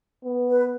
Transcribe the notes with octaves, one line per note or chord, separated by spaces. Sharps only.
B3
B4